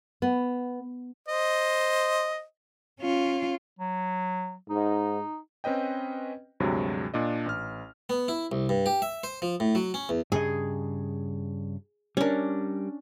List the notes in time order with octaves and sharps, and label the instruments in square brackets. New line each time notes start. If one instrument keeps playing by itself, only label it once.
[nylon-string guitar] B3
[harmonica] C5 D#5
[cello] C#4 F4
[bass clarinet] F#3
[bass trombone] G#2 [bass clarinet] D#4
[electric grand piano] C4 C#4 B4 D#5 G5
D2 G2 C3 F#3 G#3
A#2 D4 D#5
A1 F6
[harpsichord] B3
E4
C2
G2
G4
E5
C5
F3
A2
F#3
C#4
E2
[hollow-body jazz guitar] G2 C#3 D#5 [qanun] G#4
[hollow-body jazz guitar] G3 A#4 [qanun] C#4 D4